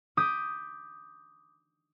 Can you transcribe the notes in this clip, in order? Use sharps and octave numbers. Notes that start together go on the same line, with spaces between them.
D6 D#6 G6 B6 D#7